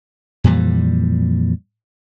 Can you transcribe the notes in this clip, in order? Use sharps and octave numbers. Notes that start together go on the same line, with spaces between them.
F2 A#2 E3 G3